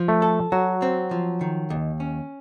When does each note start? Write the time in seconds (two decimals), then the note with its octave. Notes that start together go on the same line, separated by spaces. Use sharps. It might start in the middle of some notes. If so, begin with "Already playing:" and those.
Already playing: F3
0.08 A3
0.22 A4
0.52 F#3 F#4
0.82 C4
1.11 F3
1.41 D#3
1.70 D#2
2.00 C#4